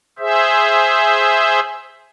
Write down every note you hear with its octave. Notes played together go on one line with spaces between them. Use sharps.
G#4 C5 E5